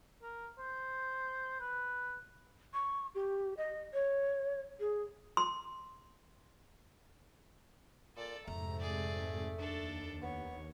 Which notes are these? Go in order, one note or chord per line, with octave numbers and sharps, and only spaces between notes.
A#4
C5
B4
C#6
G4
D#5
C#5
G#4
C6
A#2 A4 D5
F2 G#2 C3 A3 A#5
G#4 D5
D#2 D4 A4
B3 C#5